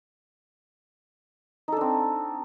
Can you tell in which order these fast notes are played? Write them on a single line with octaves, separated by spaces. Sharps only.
D#4 A4 D4 C4